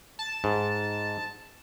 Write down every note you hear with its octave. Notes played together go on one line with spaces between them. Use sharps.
A5
G#2